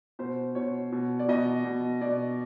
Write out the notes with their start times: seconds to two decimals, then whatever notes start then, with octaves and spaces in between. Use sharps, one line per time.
0.19 B2 C5
0.55 B2 C#5
0.92 B2
1.19 D5
1.28 B2 D#5
1.64 B2
2.01 B2 D5